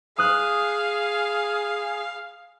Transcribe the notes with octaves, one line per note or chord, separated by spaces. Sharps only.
G#4 F5 D#6 F#6